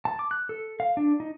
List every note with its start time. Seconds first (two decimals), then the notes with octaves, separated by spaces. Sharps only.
0.05 A5
0.19 D6
0.31 F#6
0.49 A4
0.80 F5
0.97 D4
1.20 D#4